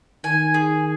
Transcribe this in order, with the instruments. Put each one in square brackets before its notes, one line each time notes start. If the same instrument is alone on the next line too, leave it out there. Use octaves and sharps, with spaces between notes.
[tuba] D#3 [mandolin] G#5
[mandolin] G#4